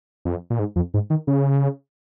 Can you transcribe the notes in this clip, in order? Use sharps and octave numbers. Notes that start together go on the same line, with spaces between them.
F2
A#2
G#2
F2
G#2
D#3
C#3